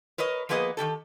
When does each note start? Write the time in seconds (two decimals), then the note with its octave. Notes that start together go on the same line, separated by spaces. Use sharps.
0.18 A#4 B4 C#5 D#5
0.49 F3 A#3 B3 G#4 B4 D#5
0.77 D#3 E3 G4 A4